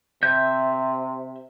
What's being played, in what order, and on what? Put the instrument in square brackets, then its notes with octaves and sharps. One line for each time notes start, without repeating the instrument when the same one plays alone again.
[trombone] C3 [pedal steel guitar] E5 G6